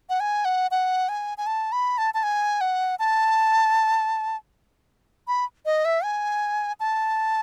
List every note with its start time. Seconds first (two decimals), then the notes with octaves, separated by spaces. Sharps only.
0.09 F#5
0.20 G#5
0.45 F#5
0.71 F#5
1.09 G#5
1.38 G#5
1.47 A5
1.72 B5
1.98 A5
2.14 A5
2.23 G#5
2.61 F#5
2.99 A5
5.28 B5
5.66 D#5
5.85 E5
6.04 G#5
6.80 A5